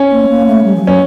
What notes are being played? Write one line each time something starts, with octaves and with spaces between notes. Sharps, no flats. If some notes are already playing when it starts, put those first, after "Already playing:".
Already playing: C#4
A#3
A3
A#3
A3
G3
F3
F#3
C#4